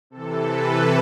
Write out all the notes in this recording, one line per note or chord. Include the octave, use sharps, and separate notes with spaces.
C3 E3 A4
B4